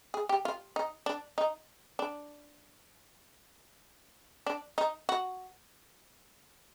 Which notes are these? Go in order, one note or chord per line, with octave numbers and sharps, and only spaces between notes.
G#4
G4
F4
D#4
D4
D#4
D4
D4
D#4
F#4